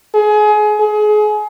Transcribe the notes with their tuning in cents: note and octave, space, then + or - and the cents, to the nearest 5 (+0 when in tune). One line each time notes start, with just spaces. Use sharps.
G#4 +25
G#4 +30